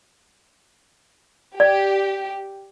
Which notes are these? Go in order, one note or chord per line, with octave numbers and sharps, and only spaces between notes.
G4 D5